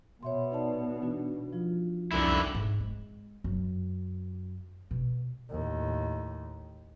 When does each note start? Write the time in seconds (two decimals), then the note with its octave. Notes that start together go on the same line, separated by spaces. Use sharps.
0.23 B2 C#5 E5 C6
0.52 D#4 D5 A5
1.01 E3 D4 F#4
1.53 F3 F4
2.12 C2 F2 D3 G3 C#4 D#4 E4
2.55 G#2
2.80 G#3
3.44 F#2
4.91 B2
5.50 D#2 A2